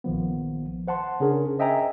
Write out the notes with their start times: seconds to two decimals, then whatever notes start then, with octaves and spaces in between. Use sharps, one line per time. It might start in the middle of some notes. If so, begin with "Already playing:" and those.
0.04 A#1 D#3 F3 B3
0.88 C5 F#5 A5 C6
1.20 C#3 C#4 D4 G#4 A#4
1.59 C5 D#5 E5 G5 G#5 A#5